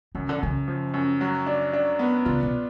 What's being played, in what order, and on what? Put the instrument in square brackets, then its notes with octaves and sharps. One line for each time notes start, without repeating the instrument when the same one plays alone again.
[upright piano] F#2 [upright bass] C#3
[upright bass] D3
[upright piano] F#2 [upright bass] C#3
[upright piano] F3
F#2
F#3
D4
D4
B3
[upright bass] C#3 [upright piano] F4
[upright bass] B2